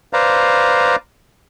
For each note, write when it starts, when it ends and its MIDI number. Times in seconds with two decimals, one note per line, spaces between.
0.13 0.96 71
0.13 0.96 72
0.13 0.96 74
0.13 0.96 77
0.13 0.96 82